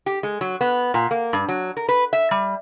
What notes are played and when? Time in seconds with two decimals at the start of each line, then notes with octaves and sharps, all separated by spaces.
0.06 G4
0.23 G#3
0.41 F#3
0.61 B3
0.94 A#2
1.11 A#3
1.33 G2
1.49 F#3
1.77 A#4
1.89 B4
2.13 E5
2.31 G3